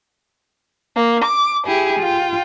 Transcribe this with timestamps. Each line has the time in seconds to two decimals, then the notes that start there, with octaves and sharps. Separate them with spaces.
0.95 A#3
1.24 D6
1.67 E4 G4 G#4
2.00 F4 G5